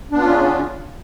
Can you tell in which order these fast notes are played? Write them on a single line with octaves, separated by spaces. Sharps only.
D4 B3 F4 C#4 C#3